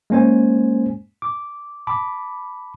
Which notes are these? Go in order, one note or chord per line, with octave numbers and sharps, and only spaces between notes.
G#3 A#3 C#4 C5 G#5
D6
A5 B5 D6